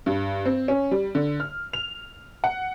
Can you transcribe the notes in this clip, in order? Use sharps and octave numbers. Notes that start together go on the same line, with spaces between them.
G2
C4
C#4
G3
D3
F6
F7
F#5